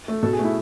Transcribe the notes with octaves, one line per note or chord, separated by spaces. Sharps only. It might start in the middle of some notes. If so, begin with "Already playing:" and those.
A3
B2 A4
G#4
A3
E4